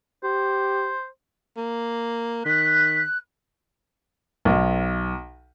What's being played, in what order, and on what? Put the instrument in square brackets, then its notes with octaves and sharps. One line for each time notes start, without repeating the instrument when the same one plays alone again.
[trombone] G4 [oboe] C5
[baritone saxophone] A#3
[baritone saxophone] D#3 [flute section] F#6 [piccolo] B6
[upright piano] B1